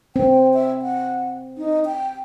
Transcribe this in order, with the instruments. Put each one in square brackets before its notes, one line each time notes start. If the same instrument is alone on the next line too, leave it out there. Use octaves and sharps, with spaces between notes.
[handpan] C4 [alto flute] G5
[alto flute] E5
F#5
D#4
G5